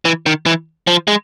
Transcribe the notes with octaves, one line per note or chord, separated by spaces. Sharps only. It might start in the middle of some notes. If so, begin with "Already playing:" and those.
E3
D#3
E3
F3
G#3